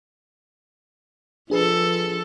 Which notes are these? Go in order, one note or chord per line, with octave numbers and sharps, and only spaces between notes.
F3 D4 G#4 A4 B4